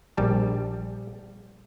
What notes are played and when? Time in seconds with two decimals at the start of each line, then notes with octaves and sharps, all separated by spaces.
0.17 A#1 G3 A5